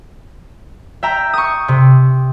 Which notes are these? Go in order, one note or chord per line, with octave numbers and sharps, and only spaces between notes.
E5 G5 A#5
C#6 D#6
C3